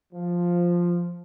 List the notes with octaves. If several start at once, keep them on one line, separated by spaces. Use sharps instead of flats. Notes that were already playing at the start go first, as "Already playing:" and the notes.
F3